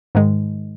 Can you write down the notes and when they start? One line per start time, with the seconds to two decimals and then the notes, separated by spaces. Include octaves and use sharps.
0.15 G#2 D#3 G#3